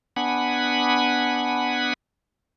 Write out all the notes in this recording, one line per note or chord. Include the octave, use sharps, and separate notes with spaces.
B3 D4 F#5 G#5 B5